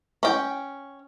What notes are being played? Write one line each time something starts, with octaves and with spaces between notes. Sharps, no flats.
C#4 G5